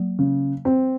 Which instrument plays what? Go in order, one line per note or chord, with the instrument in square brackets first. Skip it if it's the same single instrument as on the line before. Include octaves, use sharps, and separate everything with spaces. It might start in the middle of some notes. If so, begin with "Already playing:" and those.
Already playing: [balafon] F#3 A#3
[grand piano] C#3
C4